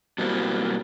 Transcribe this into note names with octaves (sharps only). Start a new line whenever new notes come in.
B2 F#3 G3 A#3 C4 E4